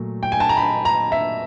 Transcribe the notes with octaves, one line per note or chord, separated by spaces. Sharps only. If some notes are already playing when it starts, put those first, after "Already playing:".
Already playing: A#2 F#3 A3
G5
G#5
A5
A#5
B5
A#5
E5